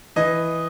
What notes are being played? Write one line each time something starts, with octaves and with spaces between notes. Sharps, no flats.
E3 D#5